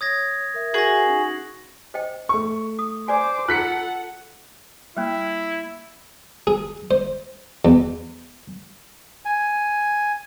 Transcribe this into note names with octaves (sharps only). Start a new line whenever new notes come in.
C#5 D#6 G#6 A#6
A#4 E5
F#4 G#4 A#6 F#7
C#4 D#4
C5 D#5 G5
A3 C#6
D#6
B4 C5 D5 G#5 D6
F4 A4 B4 F#5 A#5 F#6 B6 C#7
G3 A#3 E4
G#4
C5
E2
G#5